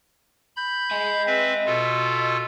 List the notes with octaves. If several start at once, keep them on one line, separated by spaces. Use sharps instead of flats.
B5 G6
D#5 G#5
C4 B4 E5
B2 F4 A4